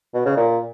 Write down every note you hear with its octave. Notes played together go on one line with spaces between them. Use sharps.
B2
C#3
A#2